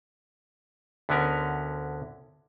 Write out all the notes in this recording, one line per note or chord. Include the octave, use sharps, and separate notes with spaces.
D2 D3 B3 C#4 A#4